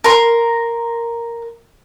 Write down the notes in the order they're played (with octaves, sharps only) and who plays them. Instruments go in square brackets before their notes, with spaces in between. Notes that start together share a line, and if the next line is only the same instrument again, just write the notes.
[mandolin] A#4 C6